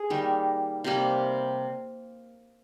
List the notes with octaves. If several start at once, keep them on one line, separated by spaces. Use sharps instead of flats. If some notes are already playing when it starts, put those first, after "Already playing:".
Already playing: G#4
D#3 G3 A#3
C3 G3 A#3